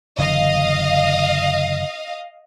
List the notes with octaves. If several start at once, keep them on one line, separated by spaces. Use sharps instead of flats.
F#1 D3 E3 D#5 F5